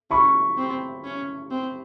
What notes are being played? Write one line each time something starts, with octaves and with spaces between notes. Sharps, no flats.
C#4 B5 C#6
C4
C#4
C4